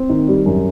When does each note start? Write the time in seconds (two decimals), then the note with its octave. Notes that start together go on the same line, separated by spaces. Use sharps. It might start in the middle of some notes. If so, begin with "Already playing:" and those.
Already playing: C4
0.09 D#3
0.28 G3
0.46 F#2